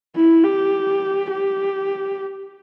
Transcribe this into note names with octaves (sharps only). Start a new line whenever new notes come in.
E4
G4
G4